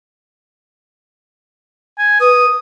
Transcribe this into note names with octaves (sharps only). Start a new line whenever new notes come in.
G#5
B4 D#6